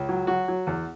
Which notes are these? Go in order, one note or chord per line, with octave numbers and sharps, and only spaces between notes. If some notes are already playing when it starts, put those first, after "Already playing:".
Already playing: C#2
F#3
F#3 F#4
F#3
E2